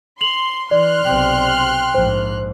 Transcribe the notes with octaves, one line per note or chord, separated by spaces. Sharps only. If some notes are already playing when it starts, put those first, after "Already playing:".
C6 F7 F#7
E3 D5 C6 F6 F#6
B1 C3 G5
A#1 G#2 C5